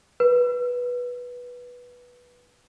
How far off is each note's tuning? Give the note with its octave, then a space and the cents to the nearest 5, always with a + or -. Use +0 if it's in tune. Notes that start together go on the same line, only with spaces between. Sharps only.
B4 -10